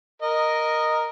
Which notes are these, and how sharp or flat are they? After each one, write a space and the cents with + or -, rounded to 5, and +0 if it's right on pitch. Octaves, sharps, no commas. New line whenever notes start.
A#4 +0 D#5 -5